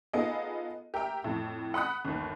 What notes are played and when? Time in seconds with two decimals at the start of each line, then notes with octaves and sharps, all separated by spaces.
0.13 B3 D#4 F4 G#4 A4 D#5
0.94 G4 A#4 E5 G5
1.24 F2 A2
1.74 F#5 B5 D#6 F#6
2.05 G1 D#2